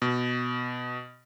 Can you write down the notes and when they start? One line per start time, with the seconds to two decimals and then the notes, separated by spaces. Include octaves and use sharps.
0.02 B2